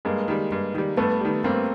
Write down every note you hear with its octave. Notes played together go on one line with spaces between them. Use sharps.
G2 G#3 A#3
D#3 G3
G2
D#3 G3
G2 A3 B3
D#3 G3
G2 A#3 C4